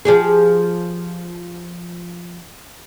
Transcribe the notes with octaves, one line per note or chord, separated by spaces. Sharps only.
F3 G4 G#4